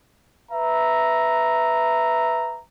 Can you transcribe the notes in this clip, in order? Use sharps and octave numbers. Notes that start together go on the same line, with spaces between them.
B4 E5 A#5